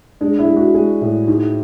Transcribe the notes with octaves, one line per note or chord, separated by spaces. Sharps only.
G#3 D4
E4
G#3
F#4
G#3 G#4
A2
G#2